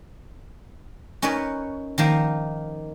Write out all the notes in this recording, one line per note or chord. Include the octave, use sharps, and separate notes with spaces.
C#4 D#4 A#4 B4 C#5
D#3 F3 A#3